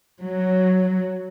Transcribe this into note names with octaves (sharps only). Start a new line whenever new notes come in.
F#3